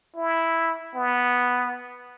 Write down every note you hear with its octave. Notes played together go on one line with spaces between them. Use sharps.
E4
B3